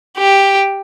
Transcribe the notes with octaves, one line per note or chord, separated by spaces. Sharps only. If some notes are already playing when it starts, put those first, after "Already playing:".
G4